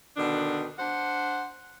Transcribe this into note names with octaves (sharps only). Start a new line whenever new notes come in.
B2 D3 D#3 D4
D4 C5 F#5